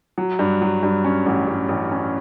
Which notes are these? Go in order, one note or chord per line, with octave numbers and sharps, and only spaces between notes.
F#3
G2
F#3
G2
C#4
A1
A1
A1
C#4